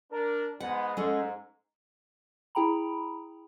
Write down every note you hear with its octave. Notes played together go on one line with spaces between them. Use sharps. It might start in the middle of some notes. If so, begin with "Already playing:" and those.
D4 A#4
G#2 G#3 B3 F#5
G#2 G#3 C#4 A4
E4 G#4 G5 A#5 B5